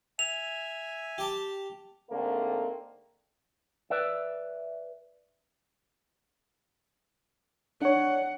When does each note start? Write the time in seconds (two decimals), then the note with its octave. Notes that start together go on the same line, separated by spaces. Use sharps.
0.19 E5 G#5 F7
1.18 G4 A5
2.11 G#2 D3 A3 A#3 C4
3.90 B4 D5 E5
7.81 D4 C#5 F#5